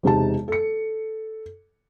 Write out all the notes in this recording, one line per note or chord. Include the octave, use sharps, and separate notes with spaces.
E1 C3 D#4 A5
A4 C#7